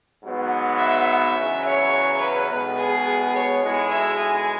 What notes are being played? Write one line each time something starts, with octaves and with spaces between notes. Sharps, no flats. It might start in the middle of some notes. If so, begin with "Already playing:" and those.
G#2 F#3 B3 F#4
E5
E2 C#3 F#3 C#4 E4
C#5
B4
B1 B2 G#3 B3
G#4
C#5
B1 B2 G#3 E4 G#4
E5
G#5